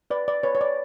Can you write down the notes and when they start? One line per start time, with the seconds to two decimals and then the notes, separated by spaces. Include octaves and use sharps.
0.10 B4 D5
0.28 D5
0.43 B4 C#5
0.55 C#5
0.61 D5